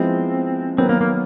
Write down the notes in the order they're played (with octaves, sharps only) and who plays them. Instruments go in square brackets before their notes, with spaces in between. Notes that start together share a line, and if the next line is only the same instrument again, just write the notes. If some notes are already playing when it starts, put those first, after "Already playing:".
Already playing: [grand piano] F3 G#3 B3 E4 [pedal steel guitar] C4
[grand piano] D#3 F#3 B3 [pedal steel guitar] C4
[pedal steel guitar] A#3
A#3